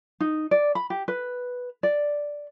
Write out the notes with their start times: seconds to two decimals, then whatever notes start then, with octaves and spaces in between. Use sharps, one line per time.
0.20 D#4
0.51 D5
0.75 B5
0.90 G4
1.08 B4
1.83 D5